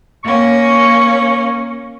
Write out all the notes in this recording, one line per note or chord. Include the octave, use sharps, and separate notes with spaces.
A#3 C#4 C#6